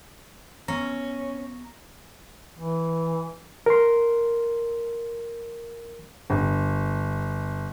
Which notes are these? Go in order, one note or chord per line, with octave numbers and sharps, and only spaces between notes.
B3 C#4 A#5 A#6
E3
A#4 C6
G1